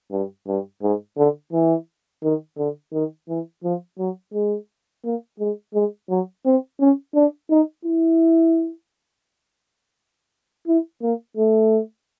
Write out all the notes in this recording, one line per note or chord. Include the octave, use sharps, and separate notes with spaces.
G2
G2
G#2
D3
E3
D#3
D3
D#3
E3
F3
F#3
G#3
A#3
G#3
G#3
F#3
C4
C#4
D4
D#4
E4
E4
A#3
A3